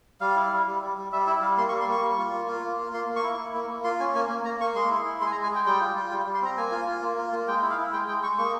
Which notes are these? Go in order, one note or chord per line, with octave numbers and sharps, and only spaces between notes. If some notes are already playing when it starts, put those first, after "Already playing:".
G3 F5
E4
G3
G3
G3
G3
G3 E5
E4 E5
G3 F5
A#3 C6
C#6
G3
C6
A#3 C#6
G3
F4
A#3
F4
A#3
F4
A#3 C6
A#3
C#6
E4
E4
A#3
A#3
F4 C6
C#4 G#5
A#3 G#5
A#3
A#3 A#5
A#3 C#6
G#3 C6
E4
E4
G#3 C6
G#5
A#5
G#3
G#5
G#3 G5
G3 G5
F4
F4
G3 G5
G3
C6
C4 A#5
A#3 G#5
F4
F4
A#3
F4
A#3
G#3 G5
E4
F5
E4
G#3 G5
G#3 G5
G#3 C#6
A#3 C#6